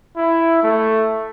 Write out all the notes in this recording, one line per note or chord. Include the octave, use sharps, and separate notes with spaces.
E4
A3